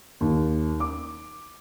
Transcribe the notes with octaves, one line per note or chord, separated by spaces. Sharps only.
D#2
D6